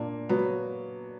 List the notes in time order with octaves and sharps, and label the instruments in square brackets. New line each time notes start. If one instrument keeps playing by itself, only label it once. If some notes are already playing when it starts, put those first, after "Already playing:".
Already playing: [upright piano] A#2 D4 [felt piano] A#3
[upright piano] F#3 [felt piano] B3